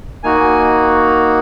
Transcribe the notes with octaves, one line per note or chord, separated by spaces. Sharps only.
A#3 D#4 F#4 G#5